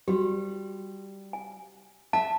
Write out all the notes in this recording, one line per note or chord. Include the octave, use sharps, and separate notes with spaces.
G3 F#4 G4
G#5
E5 A5